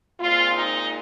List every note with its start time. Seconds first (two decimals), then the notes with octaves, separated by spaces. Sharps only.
0.20 A#2 G#3 C4 F4
0.53 D#4